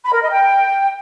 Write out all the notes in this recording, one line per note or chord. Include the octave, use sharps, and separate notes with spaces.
B5
A#4
D#5
G5